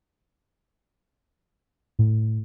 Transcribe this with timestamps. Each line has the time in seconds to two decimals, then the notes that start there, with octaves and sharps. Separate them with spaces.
1.99 A2